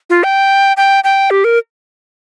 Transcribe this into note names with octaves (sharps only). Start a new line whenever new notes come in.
F4
G5
G5
G5
G4
A#4